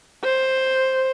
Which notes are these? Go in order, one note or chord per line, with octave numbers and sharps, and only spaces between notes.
C5